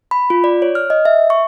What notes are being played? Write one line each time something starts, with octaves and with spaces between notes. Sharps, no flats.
B5
F4
D5
C#5
F6
D#5
E5
C#6